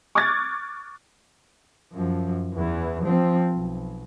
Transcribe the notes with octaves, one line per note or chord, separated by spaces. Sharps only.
C#6 D6 F6 F#6 G#6 A6
F#2 F3
E2 E3
F3 C4
B1